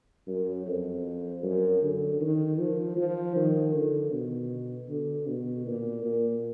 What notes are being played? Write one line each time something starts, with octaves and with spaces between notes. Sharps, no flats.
F#2
F2
F#2
D3
D#3
F3
F3
D#3
D3
B2
D3
B2
A#2
A#2